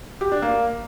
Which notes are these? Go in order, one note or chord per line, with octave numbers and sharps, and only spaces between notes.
G4
D4
A#3